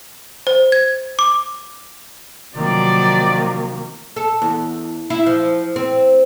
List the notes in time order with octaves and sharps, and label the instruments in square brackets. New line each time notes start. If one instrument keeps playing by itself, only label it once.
[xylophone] C5
G#6
D6
[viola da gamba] C3 F3 F#3 [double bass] D#3 A#3 [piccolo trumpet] D5
[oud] A4
E2
E4
F3
C4